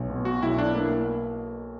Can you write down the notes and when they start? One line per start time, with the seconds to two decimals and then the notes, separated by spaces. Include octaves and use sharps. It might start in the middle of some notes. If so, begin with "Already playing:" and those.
Already playing: B1
0.10 B2
0.25 F#4
0.42 B1 E4
0.58 D4
0.74 A#3 E4